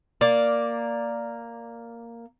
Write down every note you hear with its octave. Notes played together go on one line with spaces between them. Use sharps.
A#3 D5